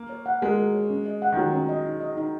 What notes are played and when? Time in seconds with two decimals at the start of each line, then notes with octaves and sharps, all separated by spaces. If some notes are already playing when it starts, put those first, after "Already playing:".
Already playing: A#3
0.09 C#5
0.26 F#5
0.42 G#3 A#4
0.57 F#4
0.74 C#5
0.90 C#4
1.06 D#5
1.22 F#5
1.32 D#3
1.37 F#3 F#4
1.53 C#4
1.69 D#5
1.86 D#4
2.01 D#5
2.17 D#4